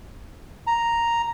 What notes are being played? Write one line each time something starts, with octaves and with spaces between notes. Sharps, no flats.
A#5